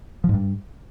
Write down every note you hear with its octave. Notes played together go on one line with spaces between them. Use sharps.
F3
G#2
G2